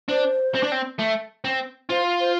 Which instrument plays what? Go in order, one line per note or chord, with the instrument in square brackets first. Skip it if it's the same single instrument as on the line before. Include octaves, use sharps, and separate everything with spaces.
[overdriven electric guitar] D4 [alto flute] C5
[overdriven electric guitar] C4
D4
C4
A3
C4
[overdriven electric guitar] F4 [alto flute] C5
[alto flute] C5